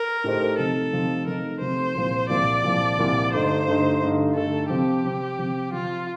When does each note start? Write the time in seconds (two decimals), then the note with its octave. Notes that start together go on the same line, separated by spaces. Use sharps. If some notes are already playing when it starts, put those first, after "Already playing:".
Already playing: A#4
0.24 A2 A3 D#4 G4 C5
0.58 C3 F3 A3 D#4 A4
0.93 C3 F3 A3 D#4
1.26 C3 F3 A3 D#4 A#4
1.61 C3 F3 A3 D#4 C5
1.95 C2 A#2 F3
2.29 C2 A#2 F3 D5
2.64 C2 A#2 F3
2.98 C2 A#2 F3
3.33 G2 D3 A3 D#4 C5
3.66 G2 D3 A3 D#4
4.01 G2 D3 A3 D#4
4.35 G2 D3 A3 D#4 A4
4.70 C3 F3 C4 G4
5.04 C3 F3 C4
5.39 C3 F3 C4
5.73 C3 F3 C4 F4